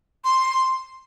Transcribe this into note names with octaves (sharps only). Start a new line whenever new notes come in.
C6